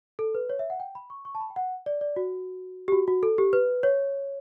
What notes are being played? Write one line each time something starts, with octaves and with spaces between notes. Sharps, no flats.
A4
B4
C#5
E5
F#5
G5
B5
C#6
C#6
A5
B5
G5
F#5
D5
D5
F#4
G4
F#4
F#4
A4
G4
B4
C#5